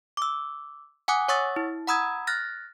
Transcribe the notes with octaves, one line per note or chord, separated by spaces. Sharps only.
D6 E6
F#5 G#5 D6 D#6 F#6
C#5 F#5 C#6 D#6 E6 A6
E4
F#5 A#5 B5 D#6 E6 G#6
F6 F#6 A6 A#6